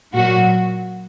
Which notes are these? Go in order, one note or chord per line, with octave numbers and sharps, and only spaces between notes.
A#2 F#3 F#4